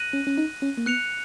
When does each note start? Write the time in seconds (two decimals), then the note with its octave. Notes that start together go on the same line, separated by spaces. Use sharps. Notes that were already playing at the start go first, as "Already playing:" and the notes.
Already playing: F#6 A#6 D#7 F#7
0.13 C#4
0.27 C#4
0.38 D#4
0.62 C#4
0.77 A#3
0.86 B3 F#6 C#7 F7